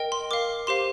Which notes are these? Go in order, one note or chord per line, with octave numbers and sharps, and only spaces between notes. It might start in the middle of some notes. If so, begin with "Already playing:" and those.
Already playing: A#4 D#5 G5
C6
A#4 F5 D6
G4 C5 F5 C6